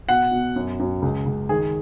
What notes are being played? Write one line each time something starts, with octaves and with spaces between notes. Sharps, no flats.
B2 F#5
B2
F#2
F#2
C#2
C#2
D#3 G#4